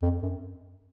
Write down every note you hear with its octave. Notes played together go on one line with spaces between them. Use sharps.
F2
F#2